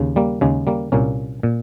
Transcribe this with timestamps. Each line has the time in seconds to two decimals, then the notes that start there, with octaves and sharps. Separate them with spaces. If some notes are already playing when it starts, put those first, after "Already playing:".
Already playing: D#2 C#3
0.16 G3 A#3
0.41 D#2 C#3 G#3
0.67 G3 A#3
0.92 C2 A#2 A#3 C#4
1.43 A#2